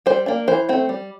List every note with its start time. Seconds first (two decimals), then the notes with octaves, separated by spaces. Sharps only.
0.06 G3 C5
0.26 A#3 D4
0.48 E3 C5
0.69 A3 C4
0.89 G3